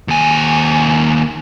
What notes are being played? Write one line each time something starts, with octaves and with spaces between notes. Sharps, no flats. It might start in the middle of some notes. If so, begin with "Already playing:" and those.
D#2 G#5